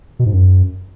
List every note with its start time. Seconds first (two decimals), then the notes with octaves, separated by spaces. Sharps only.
0.19 B2
0.26 G#2
0.33 F#2